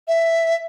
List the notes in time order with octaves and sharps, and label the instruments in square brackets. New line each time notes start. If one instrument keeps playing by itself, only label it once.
[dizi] E5